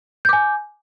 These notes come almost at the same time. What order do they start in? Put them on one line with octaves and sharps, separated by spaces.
G6 D6 G#5